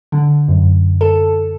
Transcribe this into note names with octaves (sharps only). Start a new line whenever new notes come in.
D3
F#2
A4